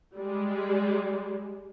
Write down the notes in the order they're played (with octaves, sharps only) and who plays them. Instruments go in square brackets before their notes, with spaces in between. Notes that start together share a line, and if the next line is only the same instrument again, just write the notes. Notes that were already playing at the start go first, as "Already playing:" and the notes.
[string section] G3 G#3